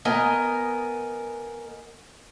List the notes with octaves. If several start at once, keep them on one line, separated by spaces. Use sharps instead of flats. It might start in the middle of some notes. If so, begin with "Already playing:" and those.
B3 A#4 D#5 G#5